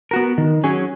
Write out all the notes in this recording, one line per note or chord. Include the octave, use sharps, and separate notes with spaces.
B3 F#4 A#4
D#3
F#3 C#4 G#4